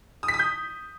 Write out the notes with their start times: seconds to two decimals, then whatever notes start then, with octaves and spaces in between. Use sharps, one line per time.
0.23 D#6
0.28 B6
0.34 D#6
0.39 G6